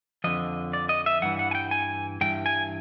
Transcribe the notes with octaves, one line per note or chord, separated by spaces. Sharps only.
F2 D3 F3 D#5
D5
D#5
E5
G2 E3 F#5
F#5
G#5
G5
G#5
G2 E3 G5
G#5